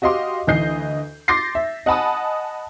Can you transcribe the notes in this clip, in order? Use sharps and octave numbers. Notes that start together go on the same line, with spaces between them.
F#4 G4 D#5 F5 C6 D6
D2 E3 D#5 G6 C7
C6 D6 G6 A6 A#6 C7
E5
D#5 F#5 G#5 A5 B5 D#6